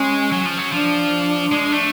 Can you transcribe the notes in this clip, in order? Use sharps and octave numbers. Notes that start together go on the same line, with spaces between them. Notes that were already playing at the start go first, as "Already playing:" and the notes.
Already playing: G#3 C#4
F#3
F3
F#3
F3 D4
G#3
A3